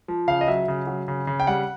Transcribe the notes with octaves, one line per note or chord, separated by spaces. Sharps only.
F3
C#3 F5
D#5
F#3 E5
C#3
F#3
C#3
C#3
G5
G3 F#5